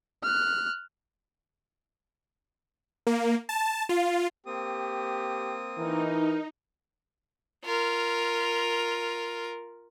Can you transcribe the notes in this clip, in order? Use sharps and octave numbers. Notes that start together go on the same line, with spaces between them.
F6 F#6
A#3
A5
F4
A#3 C4 G4 D#6
E3 D#4 A#4
F4 A#4